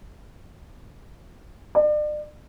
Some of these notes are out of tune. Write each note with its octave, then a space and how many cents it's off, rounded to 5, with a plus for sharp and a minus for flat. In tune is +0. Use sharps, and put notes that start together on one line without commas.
D5 +40